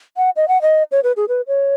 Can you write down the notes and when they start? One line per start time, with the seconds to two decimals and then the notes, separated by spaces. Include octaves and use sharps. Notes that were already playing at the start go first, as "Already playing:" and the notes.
0.17 F#5
0.36 D#5
0.48 F#5
0.62 D#5
0.92 C#5
1.04 B4
1.17 G#4
1.28 B4
1.47 C#5